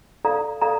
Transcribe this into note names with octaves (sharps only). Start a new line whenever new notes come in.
A4 D5 F5 A#5
A4 D5 F5 A#5